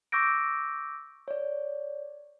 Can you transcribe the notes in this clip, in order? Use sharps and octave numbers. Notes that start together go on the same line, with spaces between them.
C#6 D6 E6 G6 A#6 D7
C#5 D5